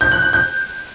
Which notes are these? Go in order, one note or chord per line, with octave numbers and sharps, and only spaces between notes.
G6
F#6
F#6
G6